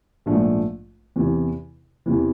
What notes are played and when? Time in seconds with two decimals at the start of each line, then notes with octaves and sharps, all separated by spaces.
0.26 A#1 G#2 F3 A3 D4
1.16 E2 C3 E3
2.06 E2 C3 E3